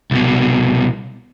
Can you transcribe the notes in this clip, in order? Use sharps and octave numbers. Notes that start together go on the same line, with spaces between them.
C2 B2